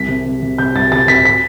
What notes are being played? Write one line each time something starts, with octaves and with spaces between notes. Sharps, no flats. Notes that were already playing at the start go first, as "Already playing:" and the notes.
Already playing: C2 B6
C3
C3
C3
C3 G6
C2 A6
C3 A6
C3 B6
B6